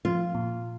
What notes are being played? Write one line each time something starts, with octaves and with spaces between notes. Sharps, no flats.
F3 F4
A#2